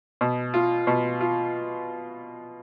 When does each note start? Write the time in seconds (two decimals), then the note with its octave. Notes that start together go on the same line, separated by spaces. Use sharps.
0.21 B2
0.54 F4
0.87 B2
1.21 F4